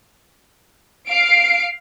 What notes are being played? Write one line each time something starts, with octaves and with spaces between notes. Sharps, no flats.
F5 C7 D7